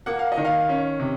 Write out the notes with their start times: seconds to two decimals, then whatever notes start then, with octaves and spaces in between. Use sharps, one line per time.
0.06 A#3 F#5
0.19 F5
0.32 D#5
0.37 D#3
0.45 F5
0.69 C#4
1.00 C3